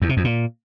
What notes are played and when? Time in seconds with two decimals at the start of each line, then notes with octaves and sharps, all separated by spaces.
0.02 E2
0.09 C3
0.17 F2
0.24 A#2